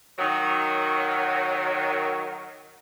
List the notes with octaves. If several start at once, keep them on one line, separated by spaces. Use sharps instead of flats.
D#3 F#3